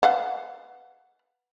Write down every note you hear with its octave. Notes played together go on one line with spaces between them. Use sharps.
B4 F5 F#5